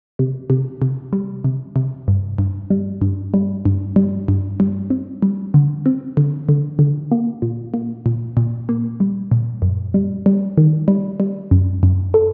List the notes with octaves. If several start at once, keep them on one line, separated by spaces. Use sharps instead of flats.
C3
C3
C3
G3
C3
C3
G2
G2
G3
G2
G3
G2
G3
G2
G3
C4
G3
D3
C4
D3
D3
D3
A#3
A#2
A#3
A#2
A#2
A#3
G3
A#2
F#2
G3
G3
D#3
G3
G3
F#2
F#2
A4